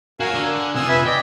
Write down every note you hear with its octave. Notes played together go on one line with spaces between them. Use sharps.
F#4 A#4 C#5 F5 G#5
D3
F#5
C3 F4 G#5 D#6 E6
B4 E5 G#5
D5 D#5 G5